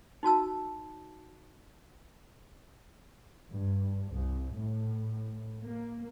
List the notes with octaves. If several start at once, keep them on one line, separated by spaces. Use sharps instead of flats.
D#4 F#4 A5 E6
G2
C2
A2
A#3